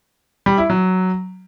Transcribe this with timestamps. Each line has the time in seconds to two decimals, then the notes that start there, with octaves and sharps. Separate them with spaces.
0.46 G3
0.58 E4
0.70 F#3